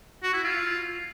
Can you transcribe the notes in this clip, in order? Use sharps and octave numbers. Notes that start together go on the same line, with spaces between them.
F#4
E4
F4